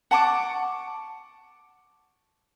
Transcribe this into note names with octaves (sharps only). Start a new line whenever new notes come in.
F#5 A5 C#6 D6